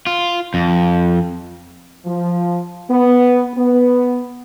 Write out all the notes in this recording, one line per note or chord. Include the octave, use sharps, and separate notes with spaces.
F4
F2
F3
B3
B3